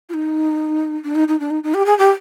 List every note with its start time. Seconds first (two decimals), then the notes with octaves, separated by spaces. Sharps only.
0.09 F4
0.14 D#4
1.04 D4
1.15 D#4
1.28 D#4
1.40 D4
1.50 D#4
1.63 D#4
1.74 G4
1.86 G#4
1.98 G4